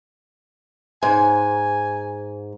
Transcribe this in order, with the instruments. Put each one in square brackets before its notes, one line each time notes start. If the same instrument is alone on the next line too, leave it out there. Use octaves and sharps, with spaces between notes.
[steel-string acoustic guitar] G#2 [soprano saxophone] G#5